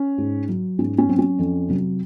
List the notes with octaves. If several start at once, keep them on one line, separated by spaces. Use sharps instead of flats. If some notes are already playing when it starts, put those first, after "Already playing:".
Already playing: C#4
G#2
F#3
G#2 C#4
C#4
F#3 C4
C#4
F2
C3 F#3